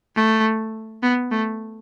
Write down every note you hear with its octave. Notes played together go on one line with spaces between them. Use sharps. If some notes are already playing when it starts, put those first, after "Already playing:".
A3
B3
A3